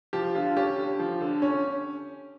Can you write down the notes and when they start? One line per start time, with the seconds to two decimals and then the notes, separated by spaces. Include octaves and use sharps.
0.13 F3 G4
0.35 D3 F4
0.57 C#4 G4
0.78 D3
0.99 F3
1.21 D3
1.42 C#4